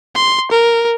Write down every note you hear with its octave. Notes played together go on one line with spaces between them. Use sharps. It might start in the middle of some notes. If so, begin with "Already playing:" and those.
C6
A#4